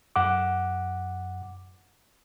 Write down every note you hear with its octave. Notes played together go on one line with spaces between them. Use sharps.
F#2 F#5 D6